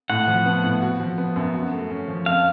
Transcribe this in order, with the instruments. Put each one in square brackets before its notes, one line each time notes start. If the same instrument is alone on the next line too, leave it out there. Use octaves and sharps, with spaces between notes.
[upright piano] A2 [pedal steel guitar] F#5
[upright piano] F3
B3
A2
F#4
F3
B3
F#2
F#4
A3
C#4
F3
[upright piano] F2 [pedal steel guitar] F5